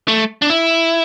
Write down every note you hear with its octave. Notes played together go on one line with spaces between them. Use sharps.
A3
D4
E4